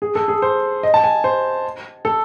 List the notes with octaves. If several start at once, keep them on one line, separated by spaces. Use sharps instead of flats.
G#4
A4
G#4
C5
D#5
A5
G#5
C5
A4